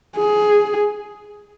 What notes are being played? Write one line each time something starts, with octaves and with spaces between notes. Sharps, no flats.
G#4